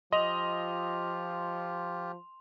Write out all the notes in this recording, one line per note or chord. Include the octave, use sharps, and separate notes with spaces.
F3 F4 G4 D#5 C6 F7